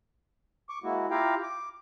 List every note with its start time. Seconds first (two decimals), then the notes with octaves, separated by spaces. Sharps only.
0.69 C#6 D6
0.84 G#3 A#3 E4 F#4
1.11 E4 F4 G4 F5 G5 A#5
1.43 D6